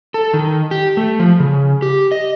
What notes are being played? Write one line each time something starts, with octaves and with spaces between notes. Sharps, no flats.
A4
D#3
G4
A3
F3
C#3
G4
D#5